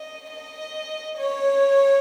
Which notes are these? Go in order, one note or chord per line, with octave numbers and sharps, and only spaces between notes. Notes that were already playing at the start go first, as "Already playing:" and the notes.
Already playing: D#5
D#5
C#5